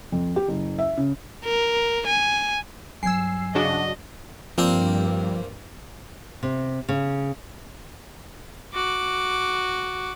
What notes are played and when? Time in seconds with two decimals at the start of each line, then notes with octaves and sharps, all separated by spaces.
0.12 F2
0.36 G4
0.48 F#1
0.79 E5
0.97 C#3
1.45 A#4
2.06 G#5
3.03 G2 F#3 G#5 E6 G#6 C7
3.55 C#3 D4 F#4 D#5
4.58 G2 F3 A#3 C4 D5
6.43 C3
6.89 C#3
8.74 F#4 D6